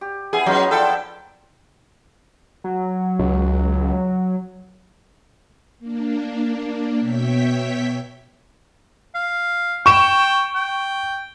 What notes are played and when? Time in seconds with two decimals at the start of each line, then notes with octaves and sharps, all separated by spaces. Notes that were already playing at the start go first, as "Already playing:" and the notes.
0.01 G4
0.33 B3 E4 G#4 G#5
0.46 F#3 C#4 D#4 F4 B4
0.71 F3 D4 E4 A4 G5
2.64 F#3
3.19 C#2
5.79 A#3 D4
7.00 B2 C#5 E5 G5 B6
9.15 F5
9.86 G5 C#6 E7
10.55 G5